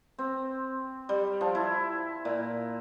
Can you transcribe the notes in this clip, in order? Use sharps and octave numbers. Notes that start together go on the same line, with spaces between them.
C4
G3
F3
E4
A#2